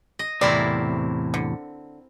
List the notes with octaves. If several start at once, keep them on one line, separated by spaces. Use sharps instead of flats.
D#5
E2 A2 C3 C4 E4 A#4 D5
D3